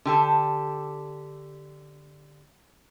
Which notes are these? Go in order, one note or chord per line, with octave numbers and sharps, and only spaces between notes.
D3 G4 A4